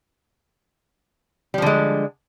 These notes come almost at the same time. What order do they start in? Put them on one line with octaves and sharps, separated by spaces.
G3 F3 D3 G#3